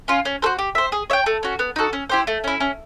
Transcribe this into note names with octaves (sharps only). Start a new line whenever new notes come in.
C#4 F4
C#4
F#4 A4 C5
G4
C5 E5
G#4
C#5 E5 G5
A3
C#4 F#4
B3
D#4 F#4 A4
C#4
E4 G4 C5
A3
C#4 E4
C#4